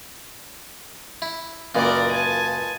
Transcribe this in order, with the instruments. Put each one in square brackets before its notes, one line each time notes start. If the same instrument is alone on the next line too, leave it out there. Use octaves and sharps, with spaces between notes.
[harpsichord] E4
[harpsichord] C#2 F#2 A#2 [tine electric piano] F4 B4 D#5 [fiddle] A#4 D5
[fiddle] G#5 A5